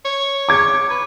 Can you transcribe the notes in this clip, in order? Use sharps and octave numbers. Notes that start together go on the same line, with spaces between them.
C#5
D6 G#6
B4